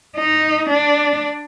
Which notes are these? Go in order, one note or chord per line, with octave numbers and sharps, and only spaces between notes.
D#4
D4